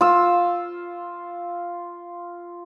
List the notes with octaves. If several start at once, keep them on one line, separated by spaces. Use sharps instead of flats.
F4 E6